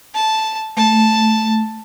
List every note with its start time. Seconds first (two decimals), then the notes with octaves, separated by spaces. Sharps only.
0.14 A5
0.77 A3 A5